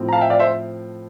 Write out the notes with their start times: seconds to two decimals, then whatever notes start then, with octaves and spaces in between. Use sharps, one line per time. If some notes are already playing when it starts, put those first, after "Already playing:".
Already playing: A2 F3 C4
0.09 A#5
0.13 F5 A5
0.21 E5 G5
0.30 D5 F5
0.40 C5 E5